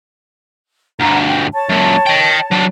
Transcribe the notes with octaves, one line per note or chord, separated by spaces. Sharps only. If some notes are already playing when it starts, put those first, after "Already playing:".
D2 G2 F#5 A#5
G5
C#5 A5
F#2 A#2
D#5 G5
F#3 D4